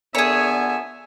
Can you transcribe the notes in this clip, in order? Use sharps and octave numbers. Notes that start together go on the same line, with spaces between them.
A#2 D3 B3 G#4 C#5 E5 G#5